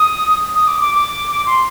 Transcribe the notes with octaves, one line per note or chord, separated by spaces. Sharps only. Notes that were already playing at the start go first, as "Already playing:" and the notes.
Already playing: D#6
D#6
D6
D6
D6
C6